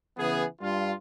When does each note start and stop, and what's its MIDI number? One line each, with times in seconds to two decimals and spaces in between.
0.18 0.45 49
0.18 0.45 52
0.18 0.45 59
0.18 0.45 68
0.61 0.92 43
0.61 0.92 65